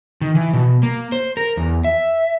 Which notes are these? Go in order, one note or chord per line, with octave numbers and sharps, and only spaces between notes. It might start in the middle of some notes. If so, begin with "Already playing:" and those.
D#3
E3
B2
A#3
C5
A#4
E2
E5